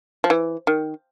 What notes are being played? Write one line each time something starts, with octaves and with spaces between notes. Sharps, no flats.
F3
E3
D#3